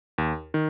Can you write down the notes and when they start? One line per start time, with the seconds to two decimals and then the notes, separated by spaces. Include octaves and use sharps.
0.18 D#2
0.54 D#3